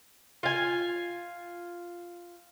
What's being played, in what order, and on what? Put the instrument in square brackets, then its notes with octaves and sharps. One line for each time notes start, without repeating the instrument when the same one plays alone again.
[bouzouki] F4 G#5